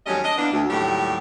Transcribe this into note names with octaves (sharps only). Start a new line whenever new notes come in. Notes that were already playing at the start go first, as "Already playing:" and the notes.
D#2 F#3 G3 A3 C#4 D#5
D4 D#5
E3 A#3 B3 D4
D2
D#2 A2 F#3 G3 G4